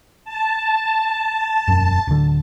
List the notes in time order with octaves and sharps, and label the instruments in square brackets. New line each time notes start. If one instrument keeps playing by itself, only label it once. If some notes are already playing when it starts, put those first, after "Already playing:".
[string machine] A5
[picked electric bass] E1 F#2
D1 D3